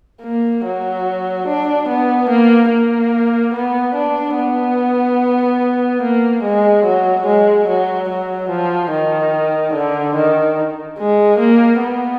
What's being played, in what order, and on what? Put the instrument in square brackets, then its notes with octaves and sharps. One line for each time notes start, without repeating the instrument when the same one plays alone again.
[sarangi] A#3
F#3
D4
B3
A#3
A#3
B3
D4
B3
A#3
G#3
F#3
G#3
F#3
F#3
F3
D#3
D3
D#3
G#3
A#3
B3